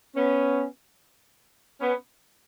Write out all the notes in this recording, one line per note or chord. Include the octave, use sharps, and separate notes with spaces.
B3 C#4
B3 C#4